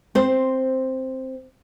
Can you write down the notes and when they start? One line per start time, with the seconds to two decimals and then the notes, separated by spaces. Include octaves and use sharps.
0.15 C4 C5